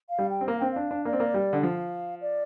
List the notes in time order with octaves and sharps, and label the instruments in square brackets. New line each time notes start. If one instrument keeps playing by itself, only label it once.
[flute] F5
[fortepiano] G3
[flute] G5
[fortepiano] C4
[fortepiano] A#3 [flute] F5
[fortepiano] C4 [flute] G5
[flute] F5
[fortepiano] D4
D4
[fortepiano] A#3 [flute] D5
[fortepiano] C4
A#3
G3
D3
[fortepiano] F3 [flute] F5
[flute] D5